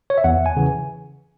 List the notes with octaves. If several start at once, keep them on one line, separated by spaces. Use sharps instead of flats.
C#5
E5
E2 F#5
G#5
C#3 E3